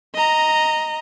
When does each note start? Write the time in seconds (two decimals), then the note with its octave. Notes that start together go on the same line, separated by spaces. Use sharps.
0.14 D#5 A#5